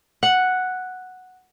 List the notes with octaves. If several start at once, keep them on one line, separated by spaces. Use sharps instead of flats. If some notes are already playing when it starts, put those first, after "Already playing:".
F#5